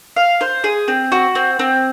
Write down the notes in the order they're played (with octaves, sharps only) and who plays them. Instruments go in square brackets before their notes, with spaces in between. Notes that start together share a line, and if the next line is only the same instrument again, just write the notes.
[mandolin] F5
C5
G#4
C4
F#4
C4
C4